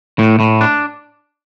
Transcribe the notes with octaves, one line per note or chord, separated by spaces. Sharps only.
A2
A2
D4